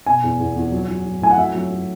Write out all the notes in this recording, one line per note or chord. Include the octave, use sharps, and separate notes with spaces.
B2 G#5
E2
E2
E2
F#3
F#3
F#3
A2 G#5
F#5
F#3 E5
F#3
F#3